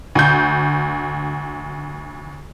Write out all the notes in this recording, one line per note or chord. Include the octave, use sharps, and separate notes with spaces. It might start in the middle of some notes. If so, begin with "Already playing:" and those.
D2 G6